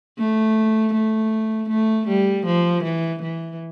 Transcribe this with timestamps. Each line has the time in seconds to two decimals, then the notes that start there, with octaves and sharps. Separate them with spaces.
0.18 A3
0.93 A3
1.69 A3
2.08 G3
2.46 F3
2.83 E3
3.22 E3